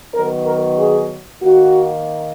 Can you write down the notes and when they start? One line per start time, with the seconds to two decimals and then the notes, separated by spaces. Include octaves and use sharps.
0.14 D#3 F#3 B3 A#4
0.46 A#4
0.78 G#4
1.42 D#3 A#3 F#4